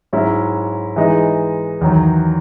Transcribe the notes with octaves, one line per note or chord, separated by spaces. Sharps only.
G#2 F#3 C#4 E4
E3 G#3 D#4
E2 D#3 F#3